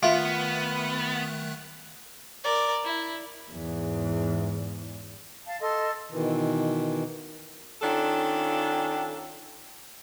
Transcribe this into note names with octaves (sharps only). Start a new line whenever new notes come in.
D#3 A3 B3 F4 E5 F#6
A#4 D5
E4
E2 G#2
F5 A5
A4 D#5 C6
B2 D#3 E3
D#3 C#4 D4 F4 A4